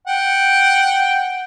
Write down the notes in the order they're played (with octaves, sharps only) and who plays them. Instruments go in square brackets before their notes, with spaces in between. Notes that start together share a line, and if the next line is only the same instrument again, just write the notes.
[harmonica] F#5 G5